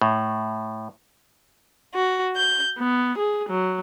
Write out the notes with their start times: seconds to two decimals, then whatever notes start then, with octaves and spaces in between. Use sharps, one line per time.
0.02 A2
1.94 F#4
2.37 G6
2.79 B3
3.18 G#4
3.48 F#3